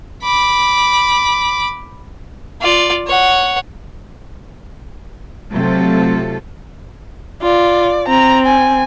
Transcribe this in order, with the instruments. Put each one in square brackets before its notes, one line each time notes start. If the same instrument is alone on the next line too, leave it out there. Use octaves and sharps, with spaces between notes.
[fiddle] B5 D6
F4 D5
C#5 F#5
[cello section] C3 F#3 A3 F4 A4
[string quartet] F4 [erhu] D5
[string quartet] C4 [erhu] A#5
[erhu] G#5